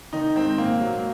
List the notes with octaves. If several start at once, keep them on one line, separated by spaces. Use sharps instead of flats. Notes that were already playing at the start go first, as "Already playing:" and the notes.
D#3 D#4
G#2 C4
A#2 A#3
F#3